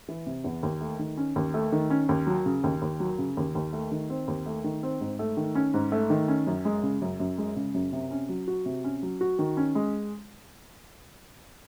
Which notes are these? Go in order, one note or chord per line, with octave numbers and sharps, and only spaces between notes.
E3
C3
E2
D#2
A3
D#3
C#4
D#2
A3
D#3
C#4
D#2
F#3
C#3
D#2
D#2
F#3
C#3
D#2
D#2
A3
D#3
C4
D#2
A3
D#3
C4
G#2
A3
D#3
C#4
G#2
A3
D#3
C#4
F#2
G#3
C#3
F#2
F#2
G#3
C#3
F#2
C3
C#4
F#3
F#4
C3
C#4
F#3
F#4
D#3
C#4
G#3